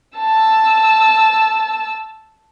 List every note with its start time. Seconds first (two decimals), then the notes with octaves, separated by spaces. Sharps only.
0.19 A5 E6